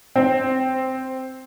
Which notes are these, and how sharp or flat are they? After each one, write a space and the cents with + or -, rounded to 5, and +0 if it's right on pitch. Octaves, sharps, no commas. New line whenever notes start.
C4 -5